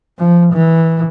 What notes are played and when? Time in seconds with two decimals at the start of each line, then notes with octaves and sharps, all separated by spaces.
0.19 F3
0.53 E3